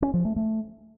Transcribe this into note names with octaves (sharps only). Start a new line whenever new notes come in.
C#4
F3
A3
A3